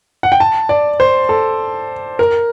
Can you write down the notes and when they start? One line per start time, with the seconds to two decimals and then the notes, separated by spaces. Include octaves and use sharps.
0.23 F#5
0.32 G5
0.40 A5
0.69 D5
1.00 C5
1.29 A4
2.19 A#4